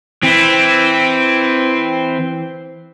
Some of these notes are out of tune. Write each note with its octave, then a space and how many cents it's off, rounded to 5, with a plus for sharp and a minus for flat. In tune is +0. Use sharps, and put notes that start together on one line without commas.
E3 +0 C4 +0